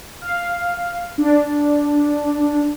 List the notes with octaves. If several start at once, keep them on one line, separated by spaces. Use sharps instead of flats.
F5
D4